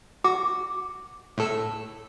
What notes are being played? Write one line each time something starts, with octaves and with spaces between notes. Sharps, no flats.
F#4 D6
A2 A4 E6